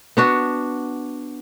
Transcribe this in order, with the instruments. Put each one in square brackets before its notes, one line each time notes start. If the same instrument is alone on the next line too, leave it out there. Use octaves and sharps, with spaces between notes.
[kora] B3 D4 F#4